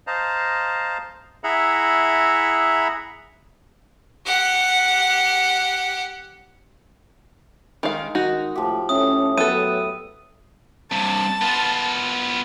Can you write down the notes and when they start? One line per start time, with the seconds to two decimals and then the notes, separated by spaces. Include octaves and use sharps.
0.07 C5 D#5 F5 A5 A#5
1.44 E4 G#4 E5 F#5 A#5 B5
4.25 G4 F#5
7.83 D#3 G#3 F5
8.15 D#3 D#4 F#4
8.55 A2 F3 G4
8.89 A2 C#4 D#6
9.38 F#3 B3 E4 A4 D#7
10.92 G2 C3 A5
11.41 B3 F4